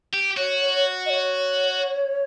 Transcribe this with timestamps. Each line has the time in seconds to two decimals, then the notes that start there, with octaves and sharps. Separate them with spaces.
0.14 G4
0.37 F#4 C#5
1.06 D#5
1.10 C#5